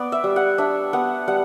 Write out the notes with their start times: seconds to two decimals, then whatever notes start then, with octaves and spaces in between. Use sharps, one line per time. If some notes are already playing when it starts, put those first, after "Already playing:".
Already playing: B3 D5
0.12 E5
0.24 G3
0.36 F#5
0.58 D4 E5
0.93 B3 F#5
1.28 G3 F#5